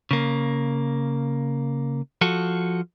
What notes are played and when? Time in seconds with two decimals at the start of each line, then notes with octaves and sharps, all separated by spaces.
0.11 C#3 A#3
2.21 F3 F#4 A4